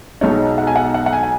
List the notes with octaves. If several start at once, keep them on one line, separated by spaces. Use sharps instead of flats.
B1 B2 G#3 D#4 C#5
F#5
G#5
F#5
F#5
F#5
G#5
G#5